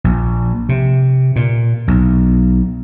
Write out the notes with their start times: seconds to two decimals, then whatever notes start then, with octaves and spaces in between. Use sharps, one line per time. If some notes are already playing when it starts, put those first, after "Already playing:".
0.04 A#1
0.69 C3
1.36 A#2
1.88 B1